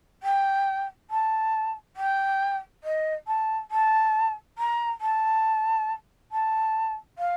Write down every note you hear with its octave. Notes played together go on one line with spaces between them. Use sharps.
G5
A5
G5
D#5
A5
A5
A#5
A5
A5
F5